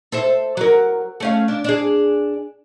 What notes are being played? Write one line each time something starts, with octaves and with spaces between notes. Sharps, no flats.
A4 C5 E5
F#3 A#4
A3 C#4 F5
D4
D4 G#4